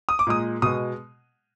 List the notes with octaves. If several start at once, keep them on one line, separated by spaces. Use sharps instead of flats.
D#6
D6
A#2 G#3 D#6
B2 G#3 D#6